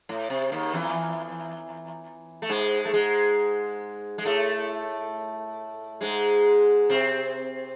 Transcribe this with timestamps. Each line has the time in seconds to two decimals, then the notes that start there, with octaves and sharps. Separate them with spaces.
0.09 A2
0.30 C3
0.52 D#2 D#3
0.74 E2 E3
2.42 A3
2.49 G#2 G#3
2.85 A3
2.93 G#2 G#3
4.18 G#3
4.25 A2 A3
6.01 G#2 G#3
6.90 C3 C4